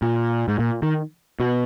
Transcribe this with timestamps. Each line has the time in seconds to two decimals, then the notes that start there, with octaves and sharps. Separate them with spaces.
0.02 A#2
0.48 G#2
0.59 A#2
0.82 D#3
1.40 B2